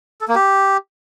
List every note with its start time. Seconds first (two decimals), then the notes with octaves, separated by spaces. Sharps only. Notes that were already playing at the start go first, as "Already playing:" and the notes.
0.21 A4
0.28 A#3
0.35 G4